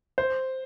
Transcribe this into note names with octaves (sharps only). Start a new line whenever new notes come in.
C5